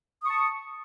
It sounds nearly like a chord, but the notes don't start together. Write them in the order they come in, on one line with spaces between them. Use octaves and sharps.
D#6 C#6 A5